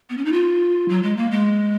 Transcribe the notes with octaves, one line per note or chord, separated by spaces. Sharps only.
B3
C#4
D#4
F4
F#3
G#3
A#3
G#3